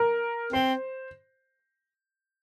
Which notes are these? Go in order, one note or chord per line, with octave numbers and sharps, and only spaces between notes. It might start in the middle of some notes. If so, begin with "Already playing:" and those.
Already playing: A#4
C4 C5